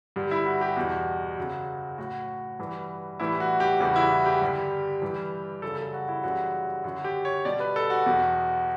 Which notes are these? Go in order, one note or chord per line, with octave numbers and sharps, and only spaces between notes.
G2 D3 G3
E4
F#4
G4
E2 B2 G3 F#4
F#2 C#3 F#3
A2 F#3 F#4
G2 E3 G3
A2 E3 G3 E4
F#4
G4
E2 C#3 E3 G3 F#4
E4
G4
G2 D3 G3
G2 E3 G3
F#2 C#3 G3 A4
A4
F#4
E4
F#2 C#3 E3 G3 F#4
F#2 D3 F#3 F#4
G4
C#5
B2 G3 D5
B4
A4
F#4
E2 B2 F#3